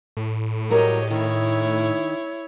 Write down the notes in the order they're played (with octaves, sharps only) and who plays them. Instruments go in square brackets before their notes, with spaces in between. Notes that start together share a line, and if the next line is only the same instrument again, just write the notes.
[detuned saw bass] A2
[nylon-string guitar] F#3 G3 A#4 [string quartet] G4 C#5 D#5
[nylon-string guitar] D#3 [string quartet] E4 C#5